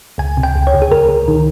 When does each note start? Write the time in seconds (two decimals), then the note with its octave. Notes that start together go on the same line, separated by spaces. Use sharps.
0.18 C#2 G#5
0.37 C3
0.43 G5
0.55 C#2
0.67 C#5
0.73 C#2
0.82 G#4
0.91 C#2 A#4
1.09 C#2
1.28 D#3